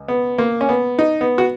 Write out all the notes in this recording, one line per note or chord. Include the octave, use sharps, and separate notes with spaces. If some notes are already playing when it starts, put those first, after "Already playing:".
Already playing: C#2
B3
A#3
C#4
B3
D#4
B3
F#4